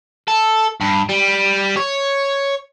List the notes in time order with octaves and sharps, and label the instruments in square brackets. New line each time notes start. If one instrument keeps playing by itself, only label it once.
[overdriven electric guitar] A4
G2
G3
C#5